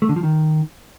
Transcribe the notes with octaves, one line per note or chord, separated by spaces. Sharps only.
A3
D3
F3
D#3